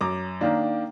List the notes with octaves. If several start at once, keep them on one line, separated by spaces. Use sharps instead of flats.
F#2 A#5 D6
D#3 A#3 D4